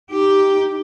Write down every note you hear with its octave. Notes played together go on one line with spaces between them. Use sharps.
D#4 G4